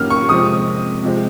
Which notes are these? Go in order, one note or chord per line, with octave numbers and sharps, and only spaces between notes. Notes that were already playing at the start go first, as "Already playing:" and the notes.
Already playing: F#2 D#3 A#3 F6
C#6
F2 C3 F3 G#3 C4 D#6
C3 F3 G#3 C4